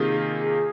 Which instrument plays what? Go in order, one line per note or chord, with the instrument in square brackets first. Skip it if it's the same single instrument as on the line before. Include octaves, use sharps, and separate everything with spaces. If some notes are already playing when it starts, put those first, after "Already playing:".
Already playing: [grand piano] C3 D#3 A#3 F4 [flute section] G#4